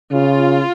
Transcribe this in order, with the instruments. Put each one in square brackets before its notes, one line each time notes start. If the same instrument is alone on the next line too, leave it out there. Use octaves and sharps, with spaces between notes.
[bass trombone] C#3 [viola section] F4